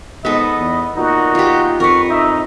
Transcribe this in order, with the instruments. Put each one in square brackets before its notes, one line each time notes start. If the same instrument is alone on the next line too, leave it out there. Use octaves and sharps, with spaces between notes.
[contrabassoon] G#2 [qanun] B3 A4 [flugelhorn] D#5 [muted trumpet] B5
[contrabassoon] E2
[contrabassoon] A#2 [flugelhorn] D#4 [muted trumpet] F#4
[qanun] F4 G4
[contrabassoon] F2 [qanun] A#4 B4 [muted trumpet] C#6
[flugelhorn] D#4 [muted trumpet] E5